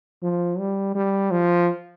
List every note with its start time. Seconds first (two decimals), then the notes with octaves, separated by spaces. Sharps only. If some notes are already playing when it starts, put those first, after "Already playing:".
0.23 F3
0.59 G3
0.95 G3
1.31 F3